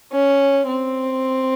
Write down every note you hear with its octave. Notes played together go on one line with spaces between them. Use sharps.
C#4
C4